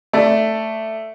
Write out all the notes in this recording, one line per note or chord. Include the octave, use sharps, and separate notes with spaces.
A3 D5